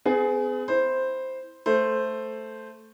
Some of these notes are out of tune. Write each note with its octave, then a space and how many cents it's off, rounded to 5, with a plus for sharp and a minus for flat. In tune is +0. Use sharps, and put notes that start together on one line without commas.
B3 +45 G#4 +15
E4 -5 C5 +0
A3 +0 C5 +0